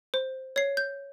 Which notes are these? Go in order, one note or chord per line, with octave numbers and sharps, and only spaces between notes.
C5
C#5 C7
G6